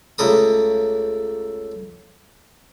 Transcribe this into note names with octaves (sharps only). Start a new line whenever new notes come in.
C#2 A3 A#4 D#6